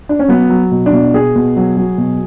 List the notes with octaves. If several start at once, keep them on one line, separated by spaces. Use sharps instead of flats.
D4
C#4
F#3 B3
F#3
B2
D4
B2
B2 G#4
B2
F#3
F#3
B2